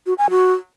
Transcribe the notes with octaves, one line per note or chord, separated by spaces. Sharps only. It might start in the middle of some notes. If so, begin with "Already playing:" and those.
F#4
G#5
F#4